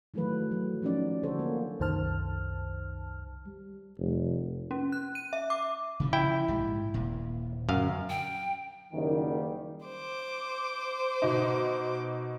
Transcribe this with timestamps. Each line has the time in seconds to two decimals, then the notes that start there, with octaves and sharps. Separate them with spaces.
0.14 D#3 E3 F#3 A3 B4
0.51 F#3
0.82 F3 F#3 C#4 D#4 D5
1.23 D3 F#4 A4 C5 C#5
1.39 A#3
1.80 C2 F#2 D#3 C5 A5 F6
3.46 G3
3.98 F1
4.71 C#4
4.92 F#6
5.15 D#7
5.33 E5
5.50 D6
6.00 C#3 E3 F3
6.13 E4 G5
6.48 A#1 G#2 G3
6.94 D#1 A#2
7.69 F#2 D3 F5
8.10 G5
8.93 F#1 D#3 G3
9.86 C5 D6
11.22 B2 D#4